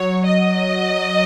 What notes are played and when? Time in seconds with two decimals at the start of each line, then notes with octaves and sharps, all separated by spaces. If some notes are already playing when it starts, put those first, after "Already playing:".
Already playing: F#3 C#5
0.26 D#5